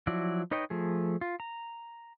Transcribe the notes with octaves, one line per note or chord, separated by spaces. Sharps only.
F3 F#3 E4 F#4 D5
D#4 B4 C#5 D#5 G5
F3 A3 G#4
F4
A#5